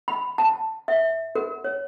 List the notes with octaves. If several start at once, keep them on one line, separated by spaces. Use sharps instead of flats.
B5
A5
E5
A#4
C#5